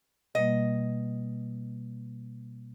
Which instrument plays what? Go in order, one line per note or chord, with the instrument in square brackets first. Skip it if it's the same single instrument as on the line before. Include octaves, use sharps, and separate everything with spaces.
[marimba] B2 G3 A#3 [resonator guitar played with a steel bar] D#5